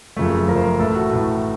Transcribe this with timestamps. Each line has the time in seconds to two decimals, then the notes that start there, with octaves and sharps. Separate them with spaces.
0.17 F#1 F#2 C#3 F3 A3
0.48 F#1 F#2 C#3 F3 A3 A#4
0.56 C5
0.64 A#4
0.79 A1 A2 A3 A4
0.95 F#4
1.10 A1 A2 A3